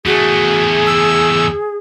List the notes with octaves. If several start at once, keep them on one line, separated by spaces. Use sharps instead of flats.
E2 A3 F#4 G#4
E6